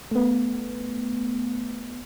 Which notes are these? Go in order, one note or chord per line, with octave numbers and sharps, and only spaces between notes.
A3 B3